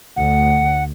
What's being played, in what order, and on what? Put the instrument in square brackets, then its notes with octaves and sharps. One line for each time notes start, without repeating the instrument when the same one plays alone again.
[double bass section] D2 [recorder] F#5